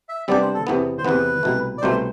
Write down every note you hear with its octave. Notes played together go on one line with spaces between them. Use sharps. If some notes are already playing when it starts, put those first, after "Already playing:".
E5
C3 G3 B3 D4 G4 D5
C5
A4
E2 C3 E3 B3
C5
E2 C3 E3 B3 B4
C2 B2 A3
D5
C2 B2 A3 C5